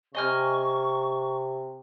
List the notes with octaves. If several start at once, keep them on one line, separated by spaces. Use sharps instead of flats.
C3 D#5 G#5 C#6 F6